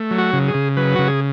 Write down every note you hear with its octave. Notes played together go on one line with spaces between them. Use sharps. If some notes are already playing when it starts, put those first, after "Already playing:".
Already playing: A3
F#3
F#4
C#3
G#4
C#3
F#3 B4
C#3 F#4
G#4